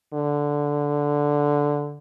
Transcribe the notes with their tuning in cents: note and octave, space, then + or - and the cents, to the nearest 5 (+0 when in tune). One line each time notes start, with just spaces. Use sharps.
D3 -5